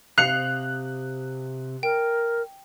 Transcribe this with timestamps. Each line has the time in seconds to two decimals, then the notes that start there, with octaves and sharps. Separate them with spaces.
0.18 C3 F5 F#6 C7 C#7 F7
1.83 A#4 G5